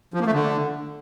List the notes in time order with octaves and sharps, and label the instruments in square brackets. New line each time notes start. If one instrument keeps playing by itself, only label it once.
[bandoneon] F3
A#3
A3
D3